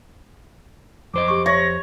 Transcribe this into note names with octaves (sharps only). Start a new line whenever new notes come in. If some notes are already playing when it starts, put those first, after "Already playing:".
F2 C5 D#5 D6
G4 C#6
C#5 E5 C#6 A#6